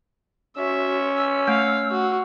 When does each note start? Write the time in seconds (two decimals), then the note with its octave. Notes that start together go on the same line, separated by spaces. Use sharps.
0.57 C#4 F#4 E5
1.17 E6
1.48 A3 F5
1.91 F#4